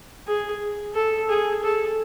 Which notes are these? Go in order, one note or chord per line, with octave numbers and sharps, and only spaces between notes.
G#4
A4
G#4
A4